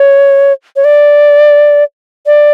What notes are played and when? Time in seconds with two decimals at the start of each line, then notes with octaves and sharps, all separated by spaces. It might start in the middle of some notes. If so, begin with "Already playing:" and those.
Already playing: C#5
0.76 C#5
0.84 D5
2.26 D5